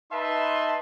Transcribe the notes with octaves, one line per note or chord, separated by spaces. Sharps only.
D#4 B4 E5 A5 C6